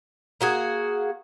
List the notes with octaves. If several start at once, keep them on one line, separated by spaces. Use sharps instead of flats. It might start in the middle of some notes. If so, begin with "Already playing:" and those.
A#3 F#4 G#4